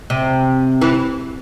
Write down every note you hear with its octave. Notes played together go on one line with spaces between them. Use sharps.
C3
E3